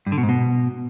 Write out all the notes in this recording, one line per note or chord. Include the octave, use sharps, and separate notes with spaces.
G2
D3
B2
G#2
B2